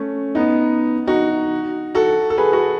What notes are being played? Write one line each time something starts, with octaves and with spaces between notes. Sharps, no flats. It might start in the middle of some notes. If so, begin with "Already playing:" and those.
Already playing: A3 C#4
B3 D#4
D#4 F#4
F#4 A4
A4
G#4 B4
F#4 A4